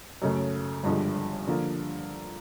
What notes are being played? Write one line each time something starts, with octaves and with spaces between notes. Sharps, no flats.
F#2 C#3 F#3 A3
G1 G2 D3 F3 G#3
D3 F3 A#3